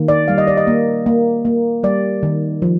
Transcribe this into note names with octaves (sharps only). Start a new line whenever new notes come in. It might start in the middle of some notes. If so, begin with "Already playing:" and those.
Already playing: D#3 A#3
D5
G3 F5
D#5
D5
D#5
A#3
A#3
A#3
G3 D5
D#3
F3